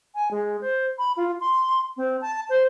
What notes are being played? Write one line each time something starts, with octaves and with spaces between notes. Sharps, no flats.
G#5
G#3
C5
B5
F4
C6
C4
A5
C5